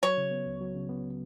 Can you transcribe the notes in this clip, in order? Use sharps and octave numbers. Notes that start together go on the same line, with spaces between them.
F#3 C#5
C#3
B3
C#2
F#3
C#3
B3